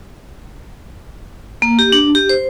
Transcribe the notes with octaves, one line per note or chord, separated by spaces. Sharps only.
A#3
G4
D4
G4
C5